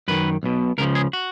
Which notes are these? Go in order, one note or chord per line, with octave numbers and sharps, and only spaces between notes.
F#2 D#3 B4
B1 B2
C#2 C#3 F3 A#4
G#4
F#4